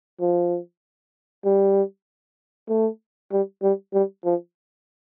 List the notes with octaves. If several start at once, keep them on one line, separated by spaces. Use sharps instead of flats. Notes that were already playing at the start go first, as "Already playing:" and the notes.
F3
G3
A3
G3
G3
G3
F3